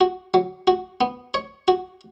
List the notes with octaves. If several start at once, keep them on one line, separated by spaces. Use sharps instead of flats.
F#4
F#3
F#4
B3
C#5
F#4